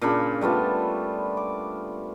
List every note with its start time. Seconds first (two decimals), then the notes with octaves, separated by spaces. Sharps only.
0.01 A#2 C#3 D4 B5
0.41 G3 A3 B3 F4
1.37 D6